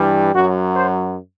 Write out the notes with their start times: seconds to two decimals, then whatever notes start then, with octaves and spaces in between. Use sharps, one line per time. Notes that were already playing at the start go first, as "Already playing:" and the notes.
Already playing: G2 E3 G3
0.34 F#2 F#3 F#4
0.75 C5